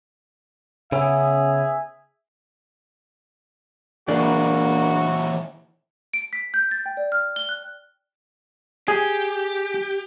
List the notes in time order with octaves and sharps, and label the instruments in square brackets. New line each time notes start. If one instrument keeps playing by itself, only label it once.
[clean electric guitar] C#3 B3 C#4 [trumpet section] G#4 E5
[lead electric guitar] A#2 E3 [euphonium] A#3 [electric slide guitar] D4 G#4 D5 [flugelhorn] F#4
[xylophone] D7
B6
G6
A6
G5
D5
F6
G7
F#6
[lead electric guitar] G4 [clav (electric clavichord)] G#4